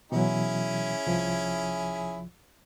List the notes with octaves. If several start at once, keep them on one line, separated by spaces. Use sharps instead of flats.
B2 E3 F#3 C#4 E4 G#4
C2 F3